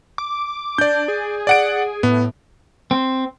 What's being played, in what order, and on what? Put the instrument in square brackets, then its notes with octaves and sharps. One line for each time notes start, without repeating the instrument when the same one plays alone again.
[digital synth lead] D6
[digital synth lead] D4 [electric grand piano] D5 G6
[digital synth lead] G#4
[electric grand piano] D5 F#5 D7
[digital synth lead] A2 [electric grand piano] B3
[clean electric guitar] C4